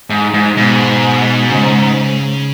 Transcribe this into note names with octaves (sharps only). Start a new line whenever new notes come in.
G#2
G#2
G#2 B2
C#3